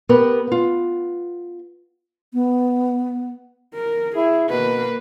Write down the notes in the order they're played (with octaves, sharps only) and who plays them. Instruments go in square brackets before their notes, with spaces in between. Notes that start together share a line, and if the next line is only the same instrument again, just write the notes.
[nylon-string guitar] B3 G4 A#4 B4
B3 F4
[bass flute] B3
[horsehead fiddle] A#4
[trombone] E4 [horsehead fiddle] G#4
[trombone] B2 [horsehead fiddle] A#3 B4